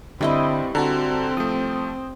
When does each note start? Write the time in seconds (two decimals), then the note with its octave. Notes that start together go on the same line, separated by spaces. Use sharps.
0.21 G2 D3 G3 C4 E4 D#5
0.75 D3 C4 F#4 A5 A#5
1.37 F3 A3 D#6